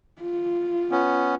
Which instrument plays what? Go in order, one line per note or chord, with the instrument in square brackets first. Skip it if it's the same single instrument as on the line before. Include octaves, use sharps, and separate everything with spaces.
[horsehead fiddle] F4
[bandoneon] B3 C#4